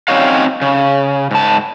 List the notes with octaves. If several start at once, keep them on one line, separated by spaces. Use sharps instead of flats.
C4 C#4 D#4 F#4 C#5 F5
C#3
G#2 A5